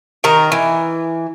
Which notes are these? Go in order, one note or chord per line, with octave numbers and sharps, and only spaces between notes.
D#3 A#4
E3